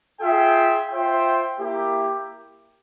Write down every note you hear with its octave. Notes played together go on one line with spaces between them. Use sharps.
F4 G#4 E5 G5
F4 C5 E5 G5
A#3 E4 G4